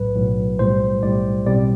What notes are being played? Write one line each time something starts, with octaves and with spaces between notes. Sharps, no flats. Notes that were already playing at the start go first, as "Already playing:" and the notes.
Already playing: B1 A2 F#3 B4
B1 A2 F#3
B1 A2 G3 C5
B1 A2 G3 D5
B1 B2 G3 C4 D5